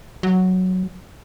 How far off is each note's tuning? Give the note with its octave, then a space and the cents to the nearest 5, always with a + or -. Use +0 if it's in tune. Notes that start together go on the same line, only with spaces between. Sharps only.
F#3 +0